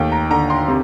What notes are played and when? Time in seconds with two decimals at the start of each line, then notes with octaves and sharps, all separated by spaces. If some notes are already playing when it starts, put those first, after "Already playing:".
Already playing: D#2 A3 G5
0.12 A#5
0.30 D3 A#5
0.50 C6
0.68 C3